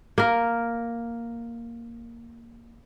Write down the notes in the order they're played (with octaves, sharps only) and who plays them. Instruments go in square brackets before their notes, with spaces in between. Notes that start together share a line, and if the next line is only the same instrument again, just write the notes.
[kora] A#3 A#4